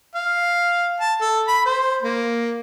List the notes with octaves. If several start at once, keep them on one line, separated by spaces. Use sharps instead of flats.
F5
A5
A4
B5
C5
A#3